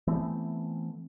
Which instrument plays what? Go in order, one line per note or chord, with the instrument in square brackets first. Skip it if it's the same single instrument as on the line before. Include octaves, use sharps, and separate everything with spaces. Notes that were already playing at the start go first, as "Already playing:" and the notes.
[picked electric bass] E3 A3 B3 C4